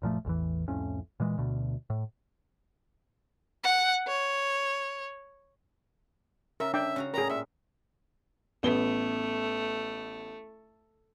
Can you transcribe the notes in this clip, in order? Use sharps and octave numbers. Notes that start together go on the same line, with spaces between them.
F#1 A#2 F3 A3
A1 E2 E3
C2 F2 A2 C#4
A#2 E3 G#3
D2 B2
A2
F#5
C#5
C#3 A#4 E5
D4 E5 G5 D6
C#3 F#4 A#5
A2 G3 G#4 A#4 A#5
A#2 E5
A1 A3 B3 G7